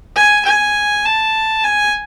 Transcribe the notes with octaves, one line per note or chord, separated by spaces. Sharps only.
G#5
G#5
A5
G#5